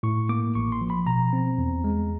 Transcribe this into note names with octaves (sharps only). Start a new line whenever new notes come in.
A2 C#6
A#3 D6
A1 C#6
C6
F3
B5
B2 A#5
C4
E2
G#3